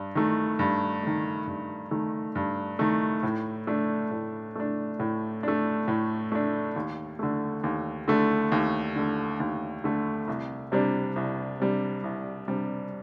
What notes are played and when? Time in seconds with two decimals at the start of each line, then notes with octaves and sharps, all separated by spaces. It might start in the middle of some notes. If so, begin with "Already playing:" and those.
Already playing: G2
0.15 D#3 A3
0.59 G2
1.03 D#3 A3
1.47 G2
1.91 D#3 A3
2.35 G2
2.79 D#3 A3
3.23 A2
3.67 A3 D4
4.11 A2
4.56 A3 D4
5.00 A2
5.43 A3 D4
5.88 A2
6.32 A3 D4
6.76 D#2
7.19 D3 A3
7.64 D#2
8.08 D3 A3
8.52 D#2
8.96 D3 A3
9.40 D#2
9.84 D3 A3
10.28 C2
10.72 C3 G3 D4
11.16 C2
11.60 C3 G3 D4
12.04 C2
12.48 C3 G3 D4